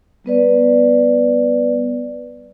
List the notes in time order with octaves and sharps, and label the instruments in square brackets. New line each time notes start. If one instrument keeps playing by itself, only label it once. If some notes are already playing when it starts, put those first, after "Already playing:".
[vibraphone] G3 B3 B4 D5